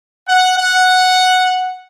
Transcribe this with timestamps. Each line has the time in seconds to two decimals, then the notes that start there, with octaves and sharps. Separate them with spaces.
0.28 F#5
0.58 F#5